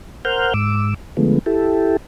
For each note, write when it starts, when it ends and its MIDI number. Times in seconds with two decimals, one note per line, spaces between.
0.25 0.54 70
0.25 0.54 72
0.25 0.54 78
0.25 0.54 89
0.25 0.54 91
0.54 0.94 44
0.54 0.94 86
0.54 0.94 88
1.17 1.39 50
1.17 1.39 53
1.17 1.39 56
1.17 1.39 57
1.17 1.39 59
1.46 1.97 64
1.46 1.97 67
1.46 1.97 69